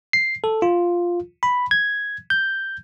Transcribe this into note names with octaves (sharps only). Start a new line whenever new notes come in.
C7
A4
F4
B5
G#6
G6